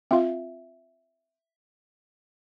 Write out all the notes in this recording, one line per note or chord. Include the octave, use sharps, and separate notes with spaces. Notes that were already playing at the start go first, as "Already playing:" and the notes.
C4 F4 E5 F5